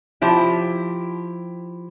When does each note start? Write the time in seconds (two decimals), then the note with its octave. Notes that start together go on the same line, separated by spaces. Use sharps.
0.22 F3 E4 G4